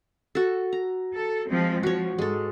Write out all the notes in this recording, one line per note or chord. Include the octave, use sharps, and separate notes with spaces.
F#4 A4
A#5
A4
F3 G#3 C4
F3 F#4 C#5
G#2 G#3 A4